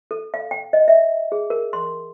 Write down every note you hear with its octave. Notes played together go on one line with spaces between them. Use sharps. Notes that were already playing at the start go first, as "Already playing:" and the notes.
A4
F5
G5
D#5
E5
G#4
A#4
C6